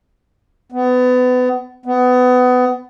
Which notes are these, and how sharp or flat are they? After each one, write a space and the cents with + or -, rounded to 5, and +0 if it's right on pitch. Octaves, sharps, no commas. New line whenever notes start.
B3 +30
B3 +25